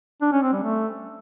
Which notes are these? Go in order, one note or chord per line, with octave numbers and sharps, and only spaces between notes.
D4
C#4
C4
G3
A3